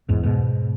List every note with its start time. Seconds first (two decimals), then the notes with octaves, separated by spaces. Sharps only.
0.09 E2 G#2
0.23 G#2 B2